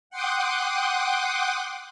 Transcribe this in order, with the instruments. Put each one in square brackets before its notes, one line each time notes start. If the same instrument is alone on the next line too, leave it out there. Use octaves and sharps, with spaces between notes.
[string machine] F#5 G5 C6 D6 D#6 F#6